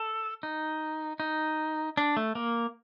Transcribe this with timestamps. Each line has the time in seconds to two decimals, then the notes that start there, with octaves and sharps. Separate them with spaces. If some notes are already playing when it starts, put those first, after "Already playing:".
Already playing: A4
0.43 D#4
1.20 D#4
1.97 D4
2.17 A3
2.35 A#3